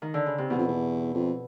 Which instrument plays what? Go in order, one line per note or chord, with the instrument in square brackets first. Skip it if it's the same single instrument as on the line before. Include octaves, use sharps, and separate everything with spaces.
[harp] D#3
D3
C#3
C3
[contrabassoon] E2 [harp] B2
[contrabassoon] F2
E2
F2